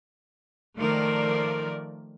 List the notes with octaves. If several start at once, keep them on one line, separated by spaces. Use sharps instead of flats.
D#3 F3 A3 A#4 D5